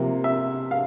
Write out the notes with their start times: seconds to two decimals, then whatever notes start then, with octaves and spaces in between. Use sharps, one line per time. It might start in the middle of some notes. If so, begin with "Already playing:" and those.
Already playing: C3 F3 A#3
0.24 E5
0.71 F5